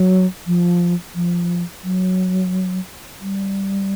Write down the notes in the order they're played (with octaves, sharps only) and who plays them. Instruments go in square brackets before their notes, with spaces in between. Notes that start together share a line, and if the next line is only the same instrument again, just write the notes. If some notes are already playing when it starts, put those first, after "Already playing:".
Already playing: [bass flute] F#3
F3
F3
F#3
G3